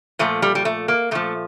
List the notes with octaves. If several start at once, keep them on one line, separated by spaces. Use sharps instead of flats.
A#2 F3 A3
G3
G3
A3
A#3
A#2 F3 A3